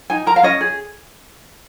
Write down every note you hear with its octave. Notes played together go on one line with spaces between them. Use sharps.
D#4 G#5
A#4 A#5
F5
C#4 D#5
G#4